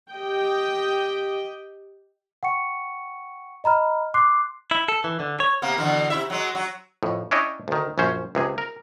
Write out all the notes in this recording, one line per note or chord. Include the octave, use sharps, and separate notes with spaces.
G4 D#5 G5
F#5 G5 C#6 C#7
D#5 A#5 B5 F6
C6 D6 F#6 C7
E4
A4
E3
D3
C#5
C3 A#3 B3
B2 D3 E3
C3 E4 E5
F#3 G#3
F#3 F#4
F2 A2
C#4 D4 E4 C#5 D#5 G5
D2 D#3
A#1 F#2 C#4 C5
C#2 C3 G#4
A#4